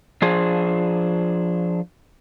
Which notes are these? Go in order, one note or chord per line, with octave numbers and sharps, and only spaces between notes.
F3 D4 F4 G#4 C5